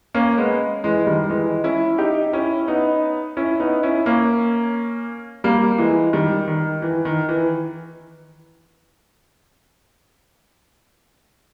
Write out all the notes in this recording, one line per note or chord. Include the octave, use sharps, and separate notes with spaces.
A#3 C#4
G#3 B3
E3 G#3
D#3 G3
E3 G#3
C#4 E4
D#4 G4
C#4 E4
B3 D#4
C#4 E4
B3 D#4
C#4 E4
A#3 C#4
G3 A#3
E3 G#3
D#3 G3
D#3
E3
D#3
E3